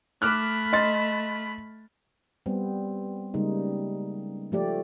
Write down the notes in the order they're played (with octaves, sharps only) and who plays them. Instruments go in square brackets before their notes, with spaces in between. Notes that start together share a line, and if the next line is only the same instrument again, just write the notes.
[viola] A3 B5 [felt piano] D6 F6 F#6
[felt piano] D#5 C6 A6
[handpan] G3 B3 C4
C#3 G3 G#3 A#3 D#4
F3 A3 G4 D5